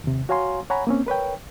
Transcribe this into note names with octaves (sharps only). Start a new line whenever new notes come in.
D#2 C3
F#4 C#5 F5 G#5 A#5 C6
C#5 F#5 G#5 A#5 B5
A#3 C4 C#4
A#4 B4 C#5 G5